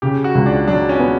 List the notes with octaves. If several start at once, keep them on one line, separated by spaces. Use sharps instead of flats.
C#3 G4
F#4
C#2
D4
F#3 D4
C#4
B3